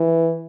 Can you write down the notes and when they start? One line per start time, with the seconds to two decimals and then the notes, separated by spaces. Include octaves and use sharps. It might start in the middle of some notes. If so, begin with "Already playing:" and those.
Already playing: E3